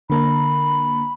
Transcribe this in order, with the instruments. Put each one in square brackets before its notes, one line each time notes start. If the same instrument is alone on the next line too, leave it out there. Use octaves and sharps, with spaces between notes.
[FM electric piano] D3 A#3 A#5 [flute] B5